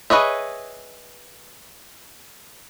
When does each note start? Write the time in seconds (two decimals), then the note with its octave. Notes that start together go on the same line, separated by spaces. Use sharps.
0.10 G#4 B4 C#5 D#5 E5